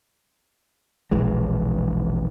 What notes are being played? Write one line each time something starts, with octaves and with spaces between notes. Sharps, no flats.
E1 A#1 E3 G#3